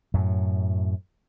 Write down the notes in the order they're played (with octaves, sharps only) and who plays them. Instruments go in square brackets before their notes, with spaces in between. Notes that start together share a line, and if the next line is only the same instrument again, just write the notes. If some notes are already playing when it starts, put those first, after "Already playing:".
[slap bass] F#2 A2 F#3